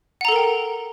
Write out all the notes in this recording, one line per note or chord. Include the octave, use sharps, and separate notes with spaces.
A4 A#4 F#5 G5 A#5